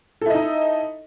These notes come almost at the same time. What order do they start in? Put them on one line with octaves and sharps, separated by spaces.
A4 E4 D#5 D#4